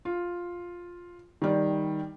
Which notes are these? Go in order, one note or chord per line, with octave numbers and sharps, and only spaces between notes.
F4
D#3 G3